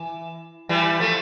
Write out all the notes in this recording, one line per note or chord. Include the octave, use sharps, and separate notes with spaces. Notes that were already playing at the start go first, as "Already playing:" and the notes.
Already playing: E3
E3 G3
F3 A3